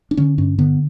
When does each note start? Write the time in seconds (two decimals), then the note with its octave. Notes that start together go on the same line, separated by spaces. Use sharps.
0.11 D4
0.17 D3 C#4
0.38 G2 C#4
0.59 D3 B3